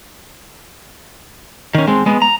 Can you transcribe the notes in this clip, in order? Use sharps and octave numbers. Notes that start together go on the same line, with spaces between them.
D#3 C#4
G#3 C4
G#3 B3
A#5